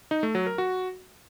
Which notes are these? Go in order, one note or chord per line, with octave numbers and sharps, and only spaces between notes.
D#4
A3
F#3
A#4
F#4